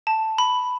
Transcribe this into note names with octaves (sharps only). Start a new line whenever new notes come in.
A5
B5